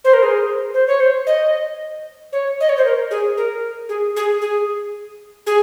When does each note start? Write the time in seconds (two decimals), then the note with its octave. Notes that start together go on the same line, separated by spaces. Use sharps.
0.04 C5
0.13 A#4
0.23 G#4
0.74 C5
0.87 C#5
1.00 C5
1.27 D#5
2.32 C#5
2.60 D#5
2.69 C#5
2.77 C5
2.85 A#4
3.11 G#4
3.37 A#4
3.89 G#4
4.16 G#4
4.42 G#4
5.47 G#4